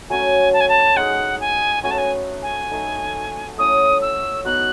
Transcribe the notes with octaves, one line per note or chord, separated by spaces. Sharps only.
F#3 A3 C#4 F#4 G#5
A5
G#5
A5
G#3 D#4 G#4 F#5
G#5
A3 C#4 F#4 B4 G#5
A5
G#5
G#5
A3 D#4 A4
A3 C#4 E4 D#6
E6
B3 D#4 F#4 F#6